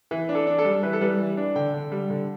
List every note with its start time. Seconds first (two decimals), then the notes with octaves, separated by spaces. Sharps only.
0.11 E3
0.29 D4
0.35 A4
0.47 D4
0.59 A4
0.65 G3
0.83 E3 B4
0.93 A4
1.01 G3 B4
1.19 E3
1.37 D4
1.55 D3 G5
1.73 D3
1.92 G3
2.10 D3